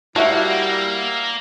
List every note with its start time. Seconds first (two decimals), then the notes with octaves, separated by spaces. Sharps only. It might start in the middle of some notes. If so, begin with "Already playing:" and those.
0.16 G3 A#3 E4 F#4 E5 F#5 A5